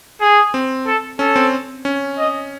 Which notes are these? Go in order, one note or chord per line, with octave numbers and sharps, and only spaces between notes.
G#4
C4
A4
C#4 A4
C4
C#4
D#5